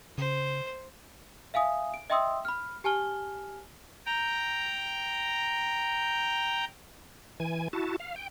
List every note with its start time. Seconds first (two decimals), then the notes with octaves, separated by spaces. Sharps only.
0.18 C#3 C5
1.54 E5 F5 G#5 D#6
1.94 D7
2.10 D#5 E5 G5 C6 D#6 E6
2.45 B5 F6
2.84 G4 G#5 A5 F6 G7
4.06 G5 A#5
7.40 E3 G#5
7.73 E4 F#4 A5
8.00 F5
8.16 G5